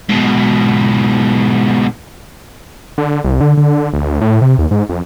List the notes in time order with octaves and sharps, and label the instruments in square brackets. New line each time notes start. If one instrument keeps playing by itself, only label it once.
[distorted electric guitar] G#2 B2
[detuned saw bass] D3
C2
D3
D3
D2
A2
C3
D#2
G#2
F2